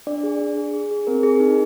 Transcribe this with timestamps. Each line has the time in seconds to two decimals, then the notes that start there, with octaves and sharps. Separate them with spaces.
0.07 D4 D5
0.23 G#4
0.40 D4
0.58 G#4
0.73 G#4
0.91 G#4
1.07 C4 A#4
1.23 G#4
1.40 D#4